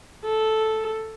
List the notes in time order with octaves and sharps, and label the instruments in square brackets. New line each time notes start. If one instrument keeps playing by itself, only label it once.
[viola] A4